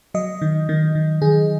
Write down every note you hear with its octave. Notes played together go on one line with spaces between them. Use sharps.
F#3 D#5
D#3
D#3
D#3
D#3 G#4